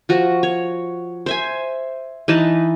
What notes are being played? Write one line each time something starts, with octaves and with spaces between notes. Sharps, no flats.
F3 F#4
C#5
C5 E5 G#5
E3 D#4 B4 A5